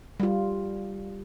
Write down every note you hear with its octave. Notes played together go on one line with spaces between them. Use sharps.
G3 F4